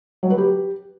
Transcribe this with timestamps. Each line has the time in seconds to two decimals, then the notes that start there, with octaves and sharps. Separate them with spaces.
0.23 F#3
0.30 B4
0.38 G4